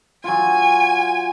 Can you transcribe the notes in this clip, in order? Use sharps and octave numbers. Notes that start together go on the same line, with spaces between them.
F#3 F4 G#5